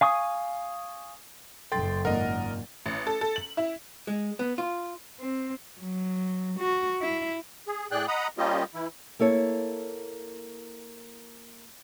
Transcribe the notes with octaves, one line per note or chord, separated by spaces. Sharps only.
F5 G#5 C#6 D#6
F#1 F#2 A4 G5 C6 A6
G#1 A#2 A#4 D#5 F#5
A1
A4
A4
F#7
E4
G#3
B3
F4
C4
F#3
F#4
E4
G#4
A2 G#4 D5 G5 F#6
D#5 F#5 A#5 B5 D#6
G3 A#3 C#4 F4 G4 D#5
E3 E4
A#3 E4 A4 C#5